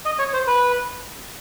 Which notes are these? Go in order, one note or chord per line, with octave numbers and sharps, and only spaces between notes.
D#5
C#5
C5
B4